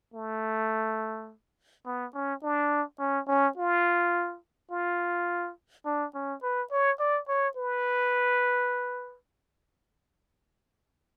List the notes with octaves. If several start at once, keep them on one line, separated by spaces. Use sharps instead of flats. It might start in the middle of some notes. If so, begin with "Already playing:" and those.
A3
B3
C#4
D4
C#4
C#4
F4
F4
D4
C#4
B4
C#5
D5
C#5
B4